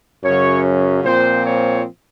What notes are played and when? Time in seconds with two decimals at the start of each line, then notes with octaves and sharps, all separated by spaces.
0.25 F#2 C#3 F#3 C#5
1.04 A#2 F3 C4 C5
1.45 C#5